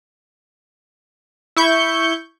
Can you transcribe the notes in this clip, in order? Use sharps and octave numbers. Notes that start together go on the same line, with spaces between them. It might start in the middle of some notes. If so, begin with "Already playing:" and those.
E4 C#6 G6